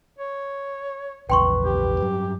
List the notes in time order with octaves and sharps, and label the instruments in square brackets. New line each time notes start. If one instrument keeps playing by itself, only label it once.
[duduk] C#5
[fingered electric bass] A#1 E2 G#2 [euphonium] B4 [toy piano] G5 C6 C#6
[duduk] G4
[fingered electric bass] G2 F#3